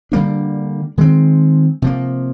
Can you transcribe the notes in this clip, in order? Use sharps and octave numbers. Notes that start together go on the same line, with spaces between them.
D3 G3 A#3 D4
D#3 G#3 C4
C3 F3 A#3